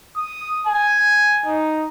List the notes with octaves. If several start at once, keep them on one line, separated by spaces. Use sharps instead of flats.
D#6
G#5
D#4